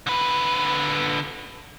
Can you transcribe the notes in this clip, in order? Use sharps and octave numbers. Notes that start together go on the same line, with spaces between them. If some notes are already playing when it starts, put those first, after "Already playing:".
D3 B4